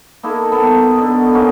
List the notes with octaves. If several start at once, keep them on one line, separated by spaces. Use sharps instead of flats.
A#3 D#4 E4 A4
B3 A4
B2 D3
A#3 C#4 D#4